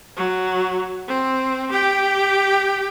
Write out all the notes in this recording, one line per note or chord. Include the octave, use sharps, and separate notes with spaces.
F#3
C4
G4 G5